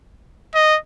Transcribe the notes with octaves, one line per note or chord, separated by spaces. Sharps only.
D#5